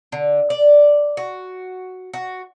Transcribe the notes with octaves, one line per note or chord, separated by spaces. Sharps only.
D3
D5
F#4
F#4